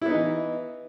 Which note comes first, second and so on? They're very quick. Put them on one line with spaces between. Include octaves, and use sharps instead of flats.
E4 B3 D#4 E3